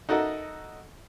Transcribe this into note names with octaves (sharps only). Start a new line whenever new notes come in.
D#4 F#4 A4 A#4 D#5 E5